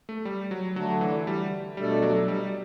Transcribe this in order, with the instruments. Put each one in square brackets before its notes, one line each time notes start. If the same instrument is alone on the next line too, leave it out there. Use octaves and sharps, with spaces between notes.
[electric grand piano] A3
G3
F#3
[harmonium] D3 A3 D4 [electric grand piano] F#3
[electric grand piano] E3
G3
[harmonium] B2 A3 D4 A4 D5 [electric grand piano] G3
[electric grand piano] F#3
G3